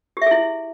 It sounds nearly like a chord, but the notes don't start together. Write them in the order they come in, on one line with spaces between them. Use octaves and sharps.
G4 E5 G#4 E4